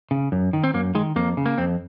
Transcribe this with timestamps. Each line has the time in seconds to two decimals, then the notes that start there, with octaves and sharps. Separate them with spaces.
0.11 C#3
0.32 F#2
0.53 D#3
0.64 C4
0.74 F#2 A#3
0.95 D#3 G#3
1.16 F2 A#3
1.37 C#3
1.46 A#3
1.58 F2 C4